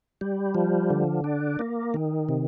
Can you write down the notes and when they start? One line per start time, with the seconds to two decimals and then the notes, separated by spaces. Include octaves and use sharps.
0.21 G3
0.55 F3
0.90 D3
1.24 D4
1.59 A#3
1.94 D#3
2.29 C3